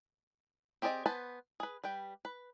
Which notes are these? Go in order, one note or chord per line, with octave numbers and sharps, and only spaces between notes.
C4 G4 G#4 D5 D#5
B3 B4 C5 G#5 A5
G#4 B4
G3 B4 G5
B4